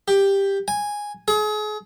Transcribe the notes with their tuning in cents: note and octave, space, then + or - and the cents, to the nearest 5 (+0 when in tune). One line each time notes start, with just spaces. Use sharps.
G4 +10
G#5 -5
G#4 +35